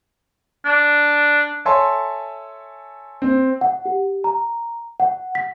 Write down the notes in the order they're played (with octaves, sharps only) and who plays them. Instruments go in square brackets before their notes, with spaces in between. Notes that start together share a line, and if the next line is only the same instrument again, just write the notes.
[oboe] D4
[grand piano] A4 C#5 E5 G#5 A5 C6
C4
[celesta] F#5
G4
A#5
F#5
B6